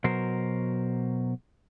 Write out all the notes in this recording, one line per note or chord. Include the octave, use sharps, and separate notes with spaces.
B2 F#3 A#4 C5